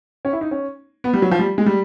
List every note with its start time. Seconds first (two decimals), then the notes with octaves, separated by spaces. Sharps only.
0.25 C#4
0.33 E4
0.41 D#4
0.51 C#4
1.04 B3
1.13 G3
1.22 F#3
1.31 F3
1.39 G3
1.58 G#3
1.66 G3